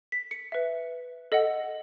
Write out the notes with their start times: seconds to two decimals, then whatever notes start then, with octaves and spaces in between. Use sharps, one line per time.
0.12 B6
0.31 C#7
0.52 B4 E5
1.32 A4 D#5 F#5